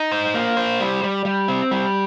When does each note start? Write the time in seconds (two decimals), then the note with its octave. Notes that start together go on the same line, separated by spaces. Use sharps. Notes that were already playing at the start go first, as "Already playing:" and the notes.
Already playing: D#4
0.12 C5
0.34 A#3
0.57 C5
0.80 G3
1.03 G3
1.25 G3
1.48 C4
1.71 G3